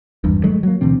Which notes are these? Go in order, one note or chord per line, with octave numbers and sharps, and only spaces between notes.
G#1 E2 G2
D#3 F#3 G#3 A3
F#3 A#3
D2 B2 E3 C4